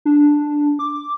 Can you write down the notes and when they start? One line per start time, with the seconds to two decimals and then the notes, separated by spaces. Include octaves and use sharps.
0.05 D4
0.79 D6